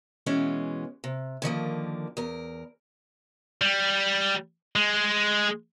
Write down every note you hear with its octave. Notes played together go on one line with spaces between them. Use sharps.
B2 E3 G#3 B3 C#4
C3
D3 D#3 F3 A#3
E2 A#4
G3
G#3